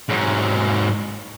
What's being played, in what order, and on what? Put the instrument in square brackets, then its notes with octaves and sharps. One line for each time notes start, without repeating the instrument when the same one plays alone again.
[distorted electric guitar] G#2 F#3